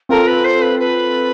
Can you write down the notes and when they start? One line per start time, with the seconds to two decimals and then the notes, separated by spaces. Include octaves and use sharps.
0.09 C4 F4 A4 A#4
0.27 B4
0.44 C5
0.61 B4
0.79 B4